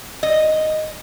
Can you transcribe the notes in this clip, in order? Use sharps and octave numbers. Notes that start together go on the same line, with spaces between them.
D#5